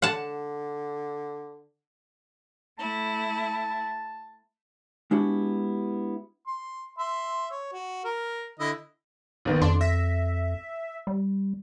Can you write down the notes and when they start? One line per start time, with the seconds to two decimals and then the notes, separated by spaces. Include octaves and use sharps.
0.02 D3 F#5 A5
2.78 A3 E4 A5
5.11 G#3 B3 D4 E4 F#4 G4
6.47 C6
6.98 E5 C6
7.51 C#5
7.72 F#4
8.04 A#4
8.60 D3 E4 D#5
9.45 A#1 D#3 B3
9.61 F2 D4 C6
9.81 E5 A#6
11.07 G3